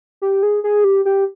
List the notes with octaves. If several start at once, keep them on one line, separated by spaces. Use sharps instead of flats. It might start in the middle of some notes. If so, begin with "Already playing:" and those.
G4
G#4
G#4
G4
G4